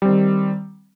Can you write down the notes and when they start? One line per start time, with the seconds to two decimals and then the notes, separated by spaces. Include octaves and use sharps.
0.02 G3
0.05 C4
0.08 D#3